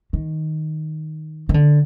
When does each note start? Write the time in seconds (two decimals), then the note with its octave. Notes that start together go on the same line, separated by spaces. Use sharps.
0.13 D#3
1.49 D#3
1.54 D3